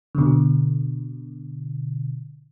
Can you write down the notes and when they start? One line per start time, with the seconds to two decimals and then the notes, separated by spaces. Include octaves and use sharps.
0.15 B2 D3